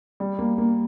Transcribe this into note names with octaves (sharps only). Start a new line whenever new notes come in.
G3
A#3
A#3